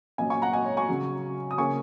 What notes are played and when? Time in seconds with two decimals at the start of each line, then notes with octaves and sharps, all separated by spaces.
0.18 A#2 F#3 C#4 D#5 G#5
0.30 G#5 C#6
0.42 F#5 A#5
0.53 D#5 G#5
0.65 C#5
0.77 G#5 C#6
0.89 C#3 F#3 C#4
1.51 D#6
1.58 C#3 A#3 C#4 G#5 C#6